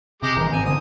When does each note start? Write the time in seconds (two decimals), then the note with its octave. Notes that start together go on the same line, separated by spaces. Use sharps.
0.22 C3 G#3 G4 D6
0.35 G1 D#3 E3 A#5
0.53 G#2 C3 C4 G#5
0.65 G1 D3 D#3 D#6